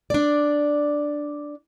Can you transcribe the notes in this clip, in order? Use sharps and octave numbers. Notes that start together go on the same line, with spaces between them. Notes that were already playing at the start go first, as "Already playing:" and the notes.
D4 D5